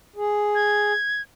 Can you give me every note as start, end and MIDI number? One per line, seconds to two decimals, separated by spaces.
0.16 0.93 68
0.55 1.22 92